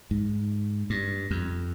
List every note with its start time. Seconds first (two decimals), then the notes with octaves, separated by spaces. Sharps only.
0.11 G#2
0.90 G2
1.31 F2